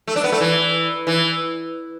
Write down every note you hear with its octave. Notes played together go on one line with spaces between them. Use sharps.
A3
D4
B3
A3
E3
E3